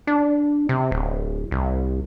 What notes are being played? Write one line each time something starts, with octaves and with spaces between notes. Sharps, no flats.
D4
C3
D1
C2